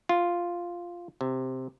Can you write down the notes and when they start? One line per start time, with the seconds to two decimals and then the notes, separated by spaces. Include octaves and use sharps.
0.09 F4
1.21 C3